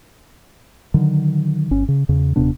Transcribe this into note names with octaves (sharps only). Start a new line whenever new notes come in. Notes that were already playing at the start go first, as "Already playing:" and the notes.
D3 D#3 F#3
G1 C#4
C#3
E2 C#3
D#1 C3 B3 D4